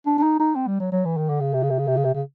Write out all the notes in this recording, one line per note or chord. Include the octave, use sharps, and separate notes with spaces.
D4
D4
D#4
D#4
C4
G3
F#3
F#3
E3
D#3
D3
C#3
C3
C#3
C3
C#3
C3
C#3
C3
C#3